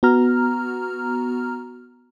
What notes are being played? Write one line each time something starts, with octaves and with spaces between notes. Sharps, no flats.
B3 F#4 A#5 F6